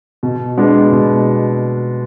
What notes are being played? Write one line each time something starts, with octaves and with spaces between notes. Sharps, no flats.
B2
G#3 B3 D4
B2